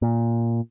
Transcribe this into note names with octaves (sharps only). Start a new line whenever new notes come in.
A#2